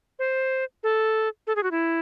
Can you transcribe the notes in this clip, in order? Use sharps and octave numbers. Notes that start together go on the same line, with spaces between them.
C5
A4
A4
G#4
F#4
E4